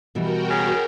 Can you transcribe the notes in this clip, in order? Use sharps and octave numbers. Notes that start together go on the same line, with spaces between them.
B2 E3 G3 F#4 A#4 G5
C#3